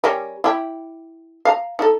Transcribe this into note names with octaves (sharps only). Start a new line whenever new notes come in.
G3 C#4 A#4
E4 G4
F5 A#5
D#4 A4